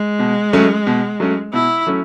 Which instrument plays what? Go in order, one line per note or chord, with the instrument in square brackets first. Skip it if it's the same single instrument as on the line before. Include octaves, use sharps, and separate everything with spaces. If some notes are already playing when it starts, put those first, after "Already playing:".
Already playing: [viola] G#3
[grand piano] B2
F#3 A3 C#4
B2
F#3 A3 C#4
[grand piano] B2 [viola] E4
[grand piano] F#3 A3 C#4